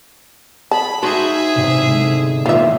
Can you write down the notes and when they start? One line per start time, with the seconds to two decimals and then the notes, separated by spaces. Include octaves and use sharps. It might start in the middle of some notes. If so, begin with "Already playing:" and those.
0.71 G#4 A5 B5 E7
1.03 D#4 F#4 G#4 C5 E5 C6
1.56 E1 G#2 C3 D#7
1.87 D3 G#3
2.46 A#2 D#3 E3 F4 E5